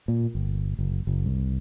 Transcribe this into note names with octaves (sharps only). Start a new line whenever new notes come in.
A#2
G1
F#1
F#1
C2